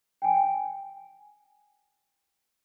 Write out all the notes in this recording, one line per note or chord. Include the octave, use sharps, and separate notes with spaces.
G5 G#5